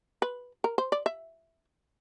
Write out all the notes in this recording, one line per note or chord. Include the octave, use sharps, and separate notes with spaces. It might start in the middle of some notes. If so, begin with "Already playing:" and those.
B4
A#4
C5
D5
E5